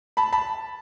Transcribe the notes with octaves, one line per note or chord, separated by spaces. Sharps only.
A5 B5
A5 B5